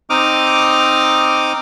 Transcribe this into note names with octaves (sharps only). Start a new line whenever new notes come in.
C4 D#4 D6 D#6 F6